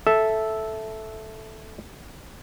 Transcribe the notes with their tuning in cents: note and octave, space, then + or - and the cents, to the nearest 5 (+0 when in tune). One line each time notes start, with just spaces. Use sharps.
A4 -5 E5 +0